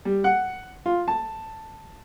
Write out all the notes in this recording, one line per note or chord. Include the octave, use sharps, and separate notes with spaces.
G3
F#5
F4
A5